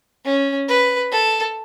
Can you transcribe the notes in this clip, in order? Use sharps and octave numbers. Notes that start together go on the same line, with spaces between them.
C#4
B4
A4